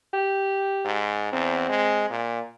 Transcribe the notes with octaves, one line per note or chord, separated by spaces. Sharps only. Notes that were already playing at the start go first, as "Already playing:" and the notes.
G4
G#2
E2 C4
G#3
A#2